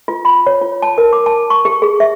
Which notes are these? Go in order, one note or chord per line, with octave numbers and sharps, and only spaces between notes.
F4
B5
C#5
F4
A5
A#4
D6
A5
C#6
G4
G#4
E5